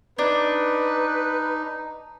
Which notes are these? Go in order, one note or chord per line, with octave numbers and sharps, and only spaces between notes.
D4 D#4 B4